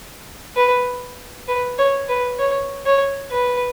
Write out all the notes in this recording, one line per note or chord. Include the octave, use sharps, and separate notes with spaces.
B4
B4
C#5
B4
C#5
C#5
B4